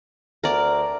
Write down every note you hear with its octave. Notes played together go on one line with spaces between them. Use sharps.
D2 A#4 D5